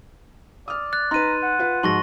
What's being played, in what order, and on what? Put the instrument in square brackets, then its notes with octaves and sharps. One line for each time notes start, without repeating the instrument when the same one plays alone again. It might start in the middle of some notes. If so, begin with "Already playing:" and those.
[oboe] D5 [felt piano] D#6 F6
[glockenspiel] F#6 A6
[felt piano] D#4 B4 [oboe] A#5 [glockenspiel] C6 D#7
[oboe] F#5
[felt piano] F4 B4
[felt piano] G#2 F3 F#4 [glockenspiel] C6 C#6 A#6